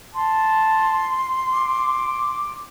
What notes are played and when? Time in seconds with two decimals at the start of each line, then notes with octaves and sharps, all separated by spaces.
0.15 A5 C6
1.54 D6